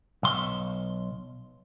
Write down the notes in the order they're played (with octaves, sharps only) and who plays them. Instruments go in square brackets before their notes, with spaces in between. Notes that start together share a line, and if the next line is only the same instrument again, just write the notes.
[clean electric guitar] B1 C6